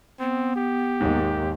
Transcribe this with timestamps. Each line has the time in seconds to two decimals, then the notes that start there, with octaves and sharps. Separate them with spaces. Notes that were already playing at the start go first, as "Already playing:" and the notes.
0.20 B3 C4
0.56 G4
1.00 D#2 G#2